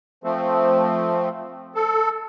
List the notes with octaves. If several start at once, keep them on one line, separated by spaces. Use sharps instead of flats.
F3 A3 C4
A4